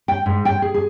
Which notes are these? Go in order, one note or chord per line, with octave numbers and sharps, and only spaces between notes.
G5
G#2
G5
G#4
G#4